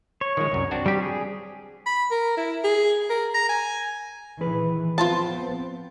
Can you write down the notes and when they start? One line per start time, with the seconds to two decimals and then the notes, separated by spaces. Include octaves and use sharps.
0.21 C#5
0.37 D#3 F3 G#3
0.52 C2 F#2
0.71 C4 D4 F#4
0.86 G3 G4
1.02 G#4
1.86 B5
2.11 A#4
2.37 E4
2.64 G#4
3.10 A#4
3.34 A#5
3.49 G#5
4.41 A#2 D#3 E3 G#4 B4
4.98 F3 B3 C4 F4 C5 A5